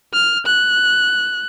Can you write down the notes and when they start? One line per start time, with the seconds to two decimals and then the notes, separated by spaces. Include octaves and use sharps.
0.13 F6
0.46 F#6